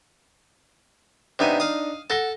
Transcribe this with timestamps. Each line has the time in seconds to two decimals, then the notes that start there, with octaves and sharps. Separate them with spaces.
1.39 C3 B3 D4 D#4 G#5 D#7
1.60 F5 D#6
2.10 A4 F#5 A#6 G7